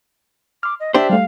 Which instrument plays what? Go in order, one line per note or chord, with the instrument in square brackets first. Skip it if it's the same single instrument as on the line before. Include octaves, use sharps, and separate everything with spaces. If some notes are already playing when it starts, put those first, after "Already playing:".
[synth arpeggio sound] C6 F6 [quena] D6
[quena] D#5
[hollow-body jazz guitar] D4 G4 C5 [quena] E5
[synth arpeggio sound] G3 A3 [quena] F5